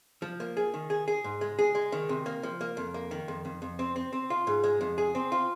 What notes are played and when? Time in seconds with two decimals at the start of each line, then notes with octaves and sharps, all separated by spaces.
0.22 F3
0.40 A#3
0.57 G#4
0.74 D#3
0.90 G#4
1.08 G#4
1.24 G#2
1.41 G#3
1.59 G#4
1.75 G#3
1.92 D#3
2.09 C3
2.26 A#3
2.43 F3
2.61 A#3
2.77 F2
2.94 A#3
3.11 D#3
3.28 F2
3.45 F2
3.62 F2
3.79 C4
3.96 C4
4.13 C4
4.30 F4
4.47 G#2
4.64 G#3
4.81 F2
4.98 G#4
5.15 C4
5.32 F4